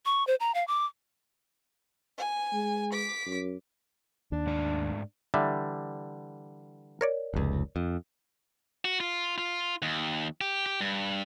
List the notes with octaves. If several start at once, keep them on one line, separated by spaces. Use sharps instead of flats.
C#6
C5
A#5
F5
D6
G#5
G#3
D6 B6
F#2
D#2 D4
G#2 A3 D5
D3 E3 G3 E5
A#4 C#5 D5
F1 C#2
F2
F#4
F4
F4
D#2
G4
G4
G2